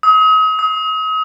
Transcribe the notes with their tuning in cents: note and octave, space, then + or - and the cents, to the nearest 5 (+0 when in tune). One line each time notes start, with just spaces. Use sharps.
D#6 +40
D#6 +40